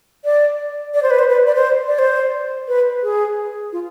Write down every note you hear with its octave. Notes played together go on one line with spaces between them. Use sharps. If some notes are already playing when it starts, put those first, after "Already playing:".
D5
D5
C5
B4
C5
B4
D5
C5
D5
C5
B4
G#4
F4